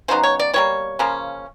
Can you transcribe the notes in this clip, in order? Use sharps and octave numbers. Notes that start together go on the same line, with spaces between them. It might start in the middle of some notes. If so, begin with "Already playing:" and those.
C#3 F#3 B3 D#4 C5
C#5
D5
B2 G3 A#3 C#5
C#3 F3 A#3 C#4